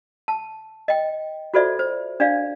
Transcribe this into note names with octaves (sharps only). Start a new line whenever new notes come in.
A5
D#5 G5
F4 F#4 A4 C5 D5 E5
C5
D4 D5 F5